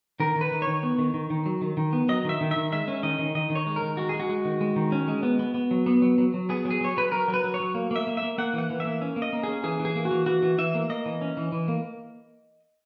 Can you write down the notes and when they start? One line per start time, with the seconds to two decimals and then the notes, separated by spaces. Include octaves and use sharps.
0.20 D#3 A#4
0.36 D#3
0.41 B4
0.52 D#3
0.62 C#5
0.67 D#3
0.83 B3
0.99 D#3
1.14 D#3
1.30 D#3
1.46 F#3
1.62 D#3
1.77 D#3
1.93 B3
2.09 F#3 D#5
2.25 D#3 E5
2.41 D#3
2.51 E5
2.56 D#3
2.72 G#3 E5
2.88 C#4
3.03 D#3 D#5
3.19 D#3
3.35 D#3 D#5
3.50 D#3
3.55 C#5
3.67 G#3
3.76 A#4
3.82 D#3
3.97 G#3 F#4
4.09 G#3 G#4
4.20 F#4
4.29 G#3
4.45 D#3
4.61 G#3
4.76 D#3
4.92 C#4
5.08 G#3
5.23 B3
5.39 B3
5.54 B3
5.71 F#3
5.86 B3
6.02 F#3
6.18 F#3
6.34 F#3
6.49 B3 G#4
6.65 F#3
6.70 G#4
6.81 F#3 C#5
6.97 F#3 B4
7.12 F#3 A#4
7.28 F#3
7.34 B4
7.44 F#3
7.54 C#5
7.60 F#3
7.75 A#3
7.91 A#3 E5
8.07 A#3
8.17 E5
8.22 A#3
8.38 A#3 F#5
8.53 E3
8.58 F#5
8.70 E3
8.80 E5
8.85 A#3
9.02 C#4
9.16 A#3
9.22 D#5
9.33 A#3
9.43 C#4 G#4
9.64 E3 G#4
9.80 E3
9.85 G#4
9.96 A#3
10.05 F#4
10.11 E3
10.26 E3 F#4
10.43 E3
10.58 E3 E5
10.75 A#3
10.90 A#3 D#5
11.06 E3
11.21 C#4
11.37 E3
11.52 E3
11.68 A#3